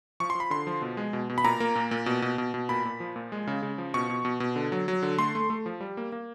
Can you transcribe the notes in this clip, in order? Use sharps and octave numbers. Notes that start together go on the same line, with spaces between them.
F3 C#6
C6
F3
B5
D3 C6
F3
B2
G#3
B2
B2
B5
A#2 A#5
A#3
A#2
A#2
B2
B2
B2
B2
A#2 B5
A#2
F3
A#2
G#3
C#3
C#3
F3
B2 C#6
B2
B2
B2
D3
F#3
F#3
D3
A3 C6
A3
A3
F3
G3
A#3
A#3